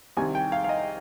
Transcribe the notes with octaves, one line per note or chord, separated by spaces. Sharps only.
C2 C3 D#3 G#5
G5
F5
F5
D#5